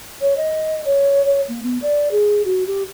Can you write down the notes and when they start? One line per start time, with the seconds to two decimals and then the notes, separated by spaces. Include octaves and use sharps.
0.21 C#5
0.37 D#5
0.85 C#5
1.26 C#5
1.48 A#3
1.63 B3
1.82 D5
2.11 G#4
2.45 F#4
2.67 G4